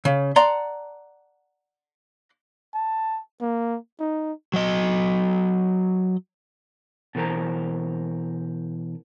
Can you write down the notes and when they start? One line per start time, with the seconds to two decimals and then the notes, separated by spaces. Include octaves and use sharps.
0.05 C#3
0.36 D5 F#5 A5 A#5 C6
2.74 A5
3.41 A#3
4.00 D#4
4.54 F#3 D#5
7.15 B2 E3 A#4 C5 A#5